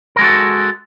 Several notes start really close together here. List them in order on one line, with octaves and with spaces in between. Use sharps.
A#4 G#3 F#4 A4